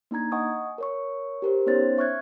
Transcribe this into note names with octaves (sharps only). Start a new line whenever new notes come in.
A#3 D4 D#4 A#5 G#6
D#5 F#5 G#5 C#6 D#6
A#4 C#5 C#6
G4 A#4 C5
B3 C#4 D#4 C5 C#5 A6
E5 C#6 F6 F#6 G#6